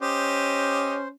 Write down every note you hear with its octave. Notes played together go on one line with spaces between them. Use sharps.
C#4 G4 C5 D#5